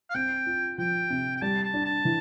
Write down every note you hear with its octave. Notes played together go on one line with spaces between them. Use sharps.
F5
C4 G5
F4
F3 G5
C3
G5
G3 A5
A5
D4
A5
E3